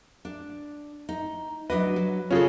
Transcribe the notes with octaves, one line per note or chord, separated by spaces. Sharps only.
D4
D#4
F#3 D4 B4 D#5
F#3
C#3 C#4 F4 A4